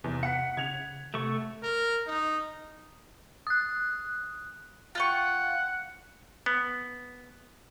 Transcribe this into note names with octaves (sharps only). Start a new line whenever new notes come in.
E2 C3
F#5 B6 C#7
C#3 G#6 F7
C3 A3 C#6
A#4
D#4
D#6 F#6
F4 F#5 G5 C#6
B3